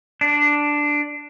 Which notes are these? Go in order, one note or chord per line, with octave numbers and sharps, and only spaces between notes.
D4